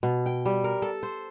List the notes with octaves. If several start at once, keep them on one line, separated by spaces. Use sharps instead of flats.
B2
G5
G3
A#4
A4
C5